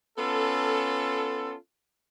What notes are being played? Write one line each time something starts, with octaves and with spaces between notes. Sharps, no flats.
B3 C#4 F4 A4